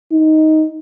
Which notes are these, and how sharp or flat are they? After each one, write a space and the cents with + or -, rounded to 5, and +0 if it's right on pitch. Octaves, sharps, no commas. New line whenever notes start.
D#4 +10